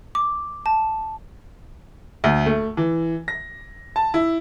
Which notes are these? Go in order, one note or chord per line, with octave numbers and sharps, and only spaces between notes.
D6
A5
D2
A3
E3
A#6
A5
E4